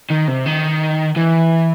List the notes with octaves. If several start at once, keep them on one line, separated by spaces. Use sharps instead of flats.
D#3
C3
D#3
E3